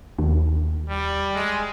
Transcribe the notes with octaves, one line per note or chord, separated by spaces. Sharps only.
D#2
G3
G#3